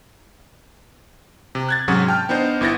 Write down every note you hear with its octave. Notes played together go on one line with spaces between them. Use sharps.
C3
F#6 G#6 A6
G#2 C3 F#3 C#4 F#4 G#4
G5 A5 F6
B3 D4 D#4 C5
G1 B3 E4 A6 A#6